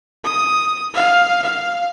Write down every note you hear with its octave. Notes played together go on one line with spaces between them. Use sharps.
D#6
F5
F5